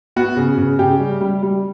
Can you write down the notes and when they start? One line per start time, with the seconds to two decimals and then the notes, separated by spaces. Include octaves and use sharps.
0.16 B3 F#4
0.37 C#3
0.57 C#3
0.79 C#3 G4
1.00 G3
1.21 G3
1.43 G3